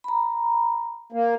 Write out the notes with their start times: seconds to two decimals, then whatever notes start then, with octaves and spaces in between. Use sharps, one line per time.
0.04 A#5 B5
1.12 A#3